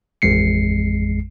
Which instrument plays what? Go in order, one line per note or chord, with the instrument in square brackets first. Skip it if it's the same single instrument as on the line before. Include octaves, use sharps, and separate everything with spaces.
[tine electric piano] A1 F2 G#3 C7 C#7